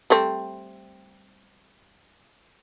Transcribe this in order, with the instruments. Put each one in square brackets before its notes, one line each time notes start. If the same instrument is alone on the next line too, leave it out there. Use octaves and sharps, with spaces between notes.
[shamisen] G3 A3 C4